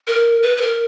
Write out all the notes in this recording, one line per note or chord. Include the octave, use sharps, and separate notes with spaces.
A#4
B4
B4
A#4